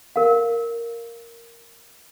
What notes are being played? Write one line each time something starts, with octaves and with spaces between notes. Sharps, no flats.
A#4 F5